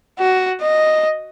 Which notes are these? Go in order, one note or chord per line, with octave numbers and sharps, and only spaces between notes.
F#4
D#5